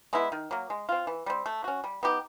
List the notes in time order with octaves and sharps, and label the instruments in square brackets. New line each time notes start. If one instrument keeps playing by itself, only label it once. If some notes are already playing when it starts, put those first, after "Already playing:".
[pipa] G#3 B3 E4
D#3
F#3 A#3
G#3
C4 F4
E3
G3 C4
A3
C#4 F#4
G3
B3 D#4 G4